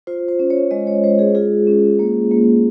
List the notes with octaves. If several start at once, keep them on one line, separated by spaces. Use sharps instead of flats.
F4 C5
C5
C#4
C#5
G#3 D#5
C#5
G#3 C5
G#4
F4 G#4
C#4
A#3
A#3